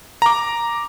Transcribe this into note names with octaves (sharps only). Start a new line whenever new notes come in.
A#5 D6